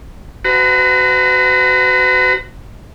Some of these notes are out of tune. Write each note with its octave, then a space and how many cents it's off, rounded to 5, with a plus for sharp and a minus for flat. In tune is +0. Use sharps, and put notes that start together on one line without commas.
F#4 +15 B4 +45 A#5 -15